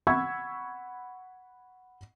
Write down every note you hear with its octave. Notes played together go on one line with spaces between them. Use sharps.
F#5 B5 C#6 E6 G#6